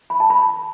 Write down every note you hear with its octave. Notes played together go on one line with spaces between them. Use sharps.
B5
A5
B5